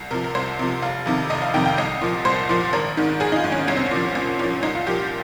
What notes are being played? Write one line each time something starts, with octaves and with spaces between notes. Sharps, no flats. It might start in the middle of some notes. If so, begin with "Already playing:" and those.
Already playing: C2
C3 F3 A#4
A#4
C2 C5
C3 F3
F1 F5
F2 C3 D#3
F1 D#5
F5
F2 C3 D#3 G5
G5
C2 D#5
A#2 F3
C2 C5
A#2 F3
G#1 A#4
G#2 D#3
G#1 G#4
D#4
F4
G#2 D#3
C#4
C2 C#4
C4
C#4
A#2 F3
C2 C#4
A#2 F3 C#4
C2 D#4
F4
A#2 F3 G4